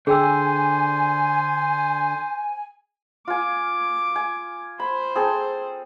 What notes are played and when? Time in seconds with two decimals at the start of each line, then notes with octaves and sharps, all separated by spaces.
0.07 D3 G#4 C5 G5 G#5 E6
3.28 F4 G#5 D6
4.16 G#5
4.80 C5 B5
5.15 C4 G#4 A4